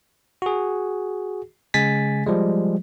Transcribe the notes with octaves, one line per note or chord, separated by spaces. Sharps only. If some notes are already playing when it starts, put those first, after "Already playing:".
F#4 G#4
C#3 G#3 G#5 A6 B6
F3 G3 G#3